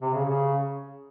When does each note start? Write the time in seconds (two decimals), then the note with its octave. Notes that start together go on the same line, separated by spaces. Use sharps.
0.02 C3
0.13 C#3
0.25 C#3